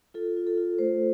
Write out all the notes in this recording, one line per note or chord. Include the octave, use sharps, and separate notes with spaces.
F4 A4
F4
A4
F4
A3 C5